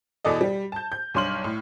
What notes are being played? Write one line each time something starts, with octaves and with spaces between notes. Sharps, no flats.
E2 B2 A4 D5 D#5
G3
A5 G6
G6
B1 G2 C#5 C6 F6 F#7
A2